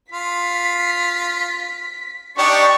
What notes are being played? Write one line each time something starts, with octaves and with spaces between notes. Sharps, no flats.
F4 B6
D4 D#4 G4 D5 G5 C#6